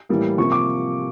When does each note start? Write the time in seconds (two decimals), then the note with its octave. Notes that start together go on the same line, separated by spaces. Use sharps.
0.09 A2 E3 G3 A#3
0.38 C3 F3 A#3 C#6
0.52 D6